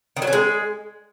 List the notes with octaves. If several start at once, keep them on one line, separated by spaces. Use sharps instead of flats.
D#3
F#3
C#4
G#3